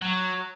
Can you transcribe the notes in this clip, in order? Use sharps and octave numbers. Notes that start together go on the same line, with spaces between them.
F#3